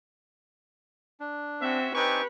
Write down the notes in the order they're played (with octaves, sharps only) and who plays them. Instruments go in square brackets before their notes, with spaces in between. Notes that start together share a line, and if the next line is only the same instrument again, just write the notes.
[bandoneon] D4
[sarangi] C4 [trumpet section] C#4 F#4 E5
[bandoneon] C4 D#4 G#5 [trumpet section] D4 G4 C#6 [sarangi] B4